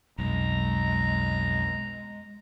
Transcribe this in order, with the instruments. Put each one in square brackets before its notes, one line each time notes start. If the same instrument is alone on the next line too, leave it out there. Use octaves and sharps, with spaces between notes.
[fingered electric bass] B1 [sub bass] F2 [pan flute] G#3 [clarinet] A#5